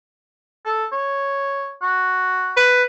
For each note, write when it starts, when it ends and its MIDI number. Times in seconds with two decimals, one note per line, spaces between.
0.66 0.85 69
0.93 1.74 73
1.82 2.70 66
2.57 2.84 71